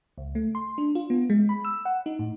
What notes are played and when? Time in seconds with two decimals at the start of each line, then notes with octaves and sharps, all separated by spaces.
0.18 C#2
0.35 A3
0.55 C6
0.78 D4
0.95 F4
1.10 B3
1.30 G#3
1.49 B5
1.65 E6
1.85 F#5
2.06 D#4
2.19 A2